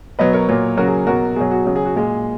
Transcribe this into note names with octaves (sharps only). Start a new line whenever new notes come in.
B2 F#3 B4 D#5
A#4 C#5
A#2 F#3
C#3 F#3 F#4 A#4
G#4
B2 F#3 F#4 A#4
B2 F#3 G#4
F#4
C#3 F#3 G#4
G#4
F#4
A#2 G#3 G#4